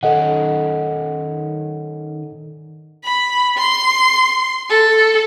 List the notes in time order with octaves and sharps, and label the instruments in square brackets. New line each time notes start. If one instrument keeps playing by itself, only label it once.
[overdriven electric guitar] D#3 C#4 [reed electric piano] A4 D#5 F#5
[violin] B5
C6
A4